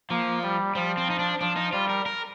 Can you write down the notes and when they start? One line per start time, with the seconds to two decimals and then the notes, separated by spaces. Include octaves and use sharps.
0.10 F3 A#3
0.43 G3
0.75 F3 G3
0.97 C4
1.10 D#4
1.19 D4
1.41 F3 D4
1.56 D#4
1.73 G3 F4
1.89 A#4
2.06 A#4